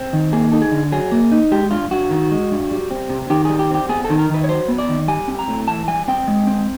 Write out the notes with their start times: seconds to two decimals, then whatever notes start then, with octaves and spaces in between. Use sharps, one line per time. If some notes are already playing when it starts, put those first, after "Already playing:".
Already playing: C4
0.13 D#3
0.33 A#3 G#4
0.52 D#4 A4
0.62 G#4
0.72 D3
0.92 F#3 G#4
1.12 A#3
1.31 D#4
1.52 G#3 G4
1.71 G2 F4
1.91 G2 F#4
2.10 D#3
2.31 G#3
2.51 G2
2.71 G3
2.91 C4
3.10 C3
3.30 D#3 G4
3.45 G3 G#4
3.59 G4
3.70 C4 G4
3.89 B3 G#4
4.04 A4
4.10 D#3
4.19 A#4
4.29 D#3 B4
4.44 C#5
4.49 F#3 C5
4.68 B3
4.78 D5
4.89 D#3
5.08 G3 G#5
5.28 C4
5.39 A#5
5.48 A2
5.68 E3 A5
5.88 G3 G#5
6.08 C4 G5
6.28 G#3
6.47 C4